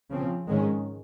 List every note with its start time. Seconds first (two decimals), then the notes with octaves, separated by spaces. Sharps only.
0.09 C#3 F3 C4
0.46 G#2 D#3 G#3 C#4